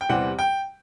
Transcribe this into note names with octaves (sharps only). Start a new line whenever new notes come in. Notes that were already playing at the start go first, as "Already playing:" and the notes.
G5
E2 C3 E3 G3 C4 F#5
G5